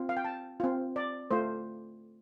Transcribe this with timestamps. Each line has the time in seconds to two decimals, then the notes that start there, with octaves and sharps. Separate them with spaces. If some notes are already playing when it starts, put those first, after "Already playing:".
Already playing: C4 F4
0.09 F5
0.17 G5
0.25 A5
0.60 C4 F4
0.96 D5
1.31 A3 F4 C5